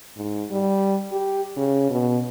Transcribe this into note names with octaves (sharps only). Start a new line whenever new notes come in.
G#2
G3
G4
C#3
B2